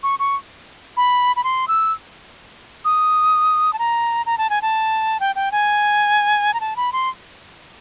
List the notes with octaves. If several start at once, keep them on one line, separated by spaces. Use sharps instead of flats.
C#6
C#6
B5
B5
C6
E6
D#6
A5
A#5
A#5
A5
G#5
A5
G5
G5
G#5
A#5
A5
B5
C6